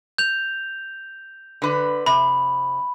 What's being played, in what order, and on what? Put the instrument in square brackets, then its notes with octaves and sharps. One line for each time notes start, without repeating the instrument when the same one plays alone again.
[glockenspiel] G6 F7
[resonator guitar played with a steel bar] D3 B4
[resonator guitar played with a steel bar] C3 [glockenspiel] B5